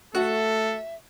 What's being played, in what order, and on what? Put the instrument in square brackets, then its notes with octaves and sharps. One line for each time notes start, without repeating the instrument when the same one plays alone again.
[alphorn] A3 [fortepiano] F#4 [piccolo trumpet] A4 [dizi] E5